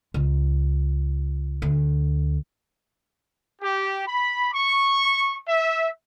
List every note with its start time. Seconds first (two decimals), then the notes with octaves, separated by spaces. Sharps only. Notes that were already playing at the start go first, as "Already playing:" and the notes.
0.14 C#2
1.62 D2
3.62 G4
4.07 B5
4.53 C#6
5.48 E5